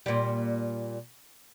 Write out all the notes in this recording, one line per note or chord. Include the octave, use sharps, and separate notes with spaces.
A#2 G3